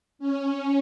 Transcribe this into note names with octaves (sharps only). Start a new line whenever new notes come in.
C#4